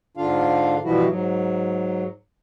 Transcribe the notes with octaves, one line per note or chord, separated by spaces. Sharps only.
G#2 D3 D4 F4 F5
B2 E3 F3 G3 E4 F#4
G#2 F#3